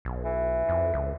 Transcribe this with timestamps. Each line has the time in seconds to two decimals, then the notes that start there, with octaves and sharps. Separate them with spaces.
0.05 B1
0.24 E3
0.69 F2
0.94 C#2